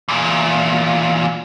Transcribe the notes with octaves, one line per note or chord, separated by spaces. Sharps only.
E2 A#2